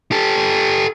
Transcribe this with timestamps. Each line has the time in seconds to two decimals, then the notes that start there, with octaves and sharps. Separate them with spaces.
0.11 G4 A4